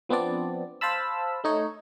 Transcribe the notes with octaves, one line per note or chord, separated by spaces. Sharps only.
F3 B3 C4 D4 D5
C5 F5 A5 B5 E6
A3 D#4 C#5